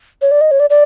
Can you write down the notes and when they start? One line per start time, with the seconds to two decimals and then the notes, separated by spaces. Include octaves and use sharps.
0.22 C#5
0.31 D5
0.41 D#5
0.51 C#5
0.60 D5
0.70 D5